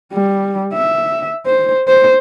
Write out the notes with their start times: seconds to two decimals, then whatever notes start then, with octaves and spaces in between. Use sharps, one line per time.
0.13 G3
0.74 E5
1.46 C5
1.88 C5